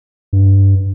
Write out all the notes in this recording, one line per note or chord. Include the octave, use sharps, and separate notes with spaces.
G2